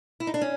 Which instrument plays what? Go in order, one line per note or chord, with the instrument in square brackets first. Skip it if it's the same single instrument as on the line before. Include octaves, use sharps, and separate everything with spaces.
[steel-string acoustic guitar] E4
D#4
D4
C#4